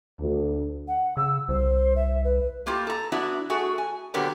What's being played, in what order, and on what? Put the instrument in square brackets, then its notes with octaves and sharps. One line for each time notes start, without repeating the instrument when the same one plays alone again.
[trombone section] D2
[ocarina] F#5
[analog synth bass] C#3 [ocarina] E6
[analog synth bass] C2 [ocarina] C5
[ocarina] E5
B4
[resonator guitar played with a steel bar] A3 A#3 E4 F4 G4
A4 A#5
B3 D4 E4 F#4
A3 F#4 G#4 A4
G#5
A#2 D3 F#3 B3 G4 A#4